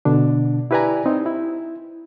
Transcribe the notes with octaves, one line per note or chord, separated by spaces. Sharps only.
B2 D3 D4
E4 G4 B4 D5 G#5 A#5
C4 D#4
E4